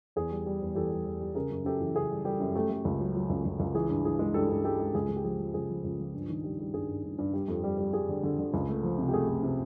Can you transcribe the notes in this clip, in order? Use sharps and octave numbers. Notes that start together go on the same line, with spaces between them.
E2 G#4
G3
G3
E2
E2 G4 A4
G3
E2
G3
C#3 G#4 A#4
F#2
F#2 G4 A4
E3
C#3 G#4
G3
G3 G4 A4
F#2
A3 G4 A4
A3
C#2
F#3
F#3
C#2
C#2
C#2
E3 G#4
G2
E3 G#4
G#3
G2 G4 A4
G2
G#3 G4 A4
G#3
C#2 G#4
C#2
G4
F3 G#4
F3
C#2 G#4
F3
C#2
F3
G2
D#3
G3
G3
G2 G#4
G2
G2
G2
G3
F2
G3
G3
G3 G#4
D3
D3
D3
C#2
A3
F3
C3
G4
A3 G#4
A3
C3